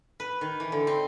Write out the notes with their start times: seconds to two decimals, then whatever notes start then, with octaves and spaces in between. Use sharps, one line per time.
0.20 B4
0.41 D#3
0.60 E3
0.72 D3
0.87 C4